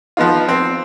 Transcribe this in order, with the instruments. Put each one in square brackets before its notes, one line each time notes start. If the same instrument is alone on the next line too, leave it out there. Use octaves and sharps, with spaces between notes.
[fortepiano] F3 B3 D#4 F4
C4